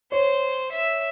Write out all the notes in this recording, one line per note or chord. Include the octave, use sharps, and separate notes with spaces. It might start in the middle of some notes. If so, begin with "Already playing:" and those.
C5 C#5
E5